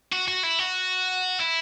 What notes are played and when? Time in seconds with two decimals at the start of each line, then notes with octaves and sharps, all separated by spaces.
0.12 F#4
0.28 F#4
0.43 E4
0.59 F#4
1.40 E4